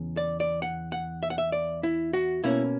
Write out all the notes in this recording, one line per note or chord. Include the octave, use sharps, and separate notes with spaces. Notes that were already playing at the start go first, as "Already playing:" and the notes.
Already playing: E2 C#3
D5
D5
F#5
F#5
E5
F#5
E5
D5
E4
F#4
B2 A#3 C#4 E4